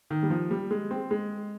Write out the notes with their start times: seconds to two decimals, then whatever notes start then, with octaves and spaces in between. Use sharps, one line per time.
0.10 D#3
0.23 G3
0.30 F3
0.51 G3
0.71 G#3
0.91 C4
1.11 G#3